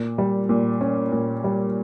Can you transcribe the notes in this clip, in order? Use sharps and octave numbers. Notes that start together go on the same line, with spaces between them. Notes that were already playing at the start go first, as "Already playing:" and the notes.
Already playing: A#2
G3
A#2
C#4
A#2
G3